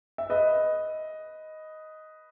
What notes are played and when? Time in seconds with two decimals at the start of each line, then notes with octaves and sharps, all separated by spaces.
0.18 E5
0.30 B4 D#5